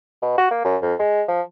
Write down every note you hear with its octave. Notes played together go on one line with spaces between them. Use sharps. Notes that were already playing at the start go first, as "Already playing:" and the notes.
B2
F#4
A#3
F#2
F2
G#3
F3